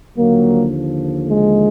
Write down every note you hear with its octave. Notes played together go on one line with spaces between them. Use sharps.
D#2 D3 F3 F#3 A#3
G#3